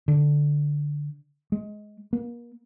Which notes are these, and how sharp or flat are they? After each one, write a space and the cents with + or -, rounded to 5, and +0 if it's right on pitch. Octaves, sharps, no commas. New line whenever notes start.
D3 +0
G#3 +15
A#3 +35